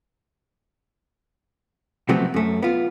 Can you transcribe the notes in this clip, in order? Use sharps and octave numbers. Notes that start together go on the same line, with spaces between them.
C3 F3 F#3 A3 B3 C4
F#2 A3
B3 F4